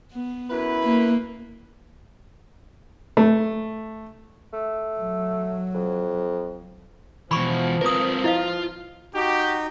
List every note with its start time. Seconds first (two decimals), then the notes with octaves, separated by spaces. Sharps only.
0.13 B3
0.50 F#2 E4 B4
0.83 A#3
3.17 A3
4.53 A3
4.99 F#3
5.75 F2
7.31 B2 E3 F3 B5 C#6
7.81 C4 A#4 B4 D#6
8.24 E4 F4 D#5 F5
9.15 D#4 F#4 G4